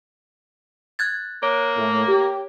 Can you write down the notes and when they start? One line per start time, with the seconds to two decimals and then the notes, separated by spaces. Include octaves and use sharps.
0.99 F#6 G#6 A6
1.43 A#3 C#5
1.76 A2 A3
2.07 G4